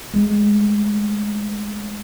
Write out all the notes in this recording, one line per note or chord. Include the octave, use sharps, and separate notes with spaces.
G#3 A3